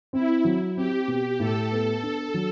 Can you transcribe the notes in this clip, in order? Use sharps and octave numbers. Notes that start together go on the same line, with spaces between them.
C4 E4
F#3
C4 G4
B2 G4
A2 A4
B3
D4
F#3